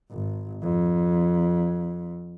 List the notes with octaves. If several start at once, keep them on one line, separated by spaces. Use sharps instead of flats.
G#1
F2